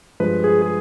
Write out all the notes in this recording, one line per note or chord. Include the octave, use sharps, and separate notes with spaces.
G2 F3 G#3 B4
G#4
G#4